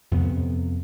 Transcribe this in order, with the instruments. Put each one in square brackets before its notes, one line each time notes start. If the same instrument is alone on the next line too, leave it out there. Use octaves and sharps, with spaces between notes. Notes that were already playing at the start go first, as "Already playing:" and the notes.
[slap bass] F2 C3 B3